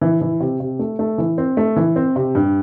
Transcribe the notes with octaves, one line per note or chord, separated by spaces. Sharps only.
E3
E3
C3
C3
A3
A3
E3
C4
A3
E3
C4
C3
G2